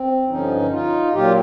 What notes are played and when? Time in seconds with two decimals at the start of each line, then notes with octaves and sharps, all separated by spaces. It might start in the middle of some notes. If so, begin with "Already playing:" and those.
Already playing: C4
0.28 G2 D3 F3 C#4 D#4
0.71 D#4 F4
1.13 A#2 F#3 F4 G4